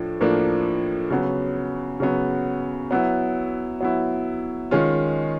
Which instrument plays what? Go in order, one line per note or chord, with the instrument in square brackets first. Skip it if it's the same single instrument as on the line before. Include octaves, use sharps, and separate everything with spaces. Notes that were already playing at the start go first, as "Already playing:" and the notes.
Already playing: [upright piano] A2 F3 D4
A2 F3 A#3 D4
C#3 F#3 B3
C#3 F#3 B3
F#3 B3 E4
F#3 B3 E4
D#3 G#3 C#4 F4